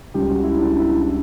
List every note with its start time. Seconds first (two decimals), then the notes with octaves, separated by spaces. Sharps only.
0.14 C#2 C#3 G3 G4
0.29 F#4
0.43 E4
0.58 D4
0.79 E4
1.01 E4